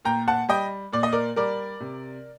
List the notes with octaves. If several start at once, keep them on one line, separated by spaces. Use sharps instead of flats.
A#2 G5 A#5
F#5 A5
G3 D#5 G5
A#2 D5
D#5
A#4 D5
G3 A#4 D5
C3